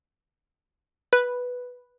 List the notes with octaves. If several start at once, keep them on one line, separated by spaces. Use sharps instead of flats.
B4